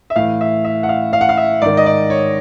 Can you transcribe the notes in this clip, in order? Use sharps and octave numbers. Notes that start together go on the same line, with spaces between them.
E5
A2 E3 F5
E5
E5
F#5
F5
F5
F#5
F5
E5
G#2 D#3 D5
D#5
D5
C#5